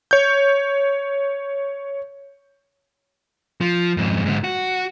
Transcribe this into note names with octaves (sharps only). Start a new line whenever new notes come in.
C#5 G6
F3
F2 G#2
G#2 D3
F#4